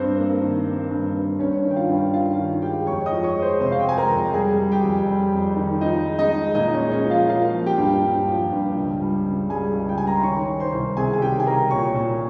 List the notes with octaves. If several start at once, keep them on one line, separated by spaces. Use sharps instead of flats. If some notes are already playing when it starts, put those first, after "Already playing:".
Already playing: G2 C4 C5
A#3
D#3
A#3
G2
G2
G2 C#4 C#5
D#3
G5
F4 F5
G2
D#3 F4 F5
D#3
G#3 G4 G5
F2 C#5 C#6
D#5 D#6
F3
C#5 C#6
G#3
C5 C6
C3 C5 C6
F5
G5
G#3 G#5
A#4 A#5
F2
G3 G#4 G#5
G3
G4 G5
F2
G3
F2
D#3
F3 D#4 D#5
G#3
D#4 D#5
G#3
A#2 D#4 D#5
D#5
C#4 C#5
G#3
C#4 C#5
F3
F4 F5
A#3 F4 F5
F3
G4 G5
G2
G2
F3
G2
C#2
G3
C#3
G3 G#4 G#5
C#2
G5
G3 G#5
A#5
C6
D#3 C#5 C#6
D#3
C5 C6
C2
C3 G#4 G#5
G#5
D#3 G4 G5
G#5
C2 A#4 A#5
A#2 C#5 C#6
A#2